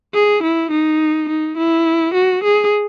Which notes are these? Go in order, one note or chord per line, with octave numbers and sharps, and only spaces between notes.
G#4
E4
D#4
D#4
E4
F#4
G#4